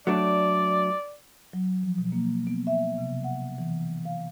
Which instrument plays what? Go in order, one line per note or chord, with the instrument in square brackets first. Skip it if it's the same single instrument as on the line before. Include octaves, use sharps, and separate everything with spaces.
[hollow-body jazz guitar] F#3 A3 D4 [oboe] D5
[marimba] F#3
F3
B2
A#3
B3
E5
C3
F#5
E3
F5